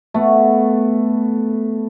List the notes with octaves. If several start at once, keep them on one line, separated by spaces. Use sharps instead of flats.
A3 B3